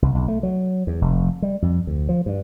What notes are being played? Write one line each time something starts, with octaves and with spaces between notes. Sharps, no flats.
C2
B1
A3
F#3
E2
F1
G3
F2
D2
F3
G2